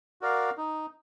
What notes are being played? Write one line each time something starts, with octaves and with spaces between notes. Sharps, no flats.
F#4 A#4 D5 F5
D#4